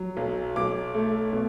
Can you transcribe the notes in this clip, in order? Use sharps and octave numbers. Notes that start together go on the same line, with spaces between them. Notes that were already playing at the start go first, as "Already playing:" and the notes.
Already playing: F#3
B1
B1 D6
A3
B2